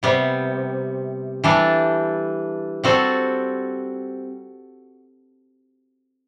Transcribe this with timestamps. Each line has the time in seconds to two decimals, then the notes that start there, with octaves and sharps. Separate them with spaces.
0.03 C3 G3 B3
1.44 E3 G3 D4 A4
2.84 G3 C4 F#4 A4